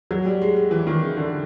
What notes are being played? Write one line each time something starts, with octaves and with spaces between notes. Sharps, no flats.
F#3
G3
G#3
G#3
E3
D#3
C#3
D3